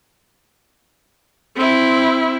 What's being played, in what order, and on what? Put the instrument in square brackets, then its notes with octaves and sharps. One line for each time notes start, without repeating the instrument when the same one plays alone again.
[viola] C4 E4